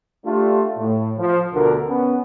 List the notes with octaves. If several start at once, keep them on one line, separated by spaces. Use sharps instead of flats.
A3 D4 F4 G4
A2
F3
D2 B2 D3 A#4
B3 C#4